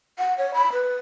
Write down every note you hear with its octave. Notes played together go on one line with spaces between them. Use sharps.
F#5
C#5
B5
B4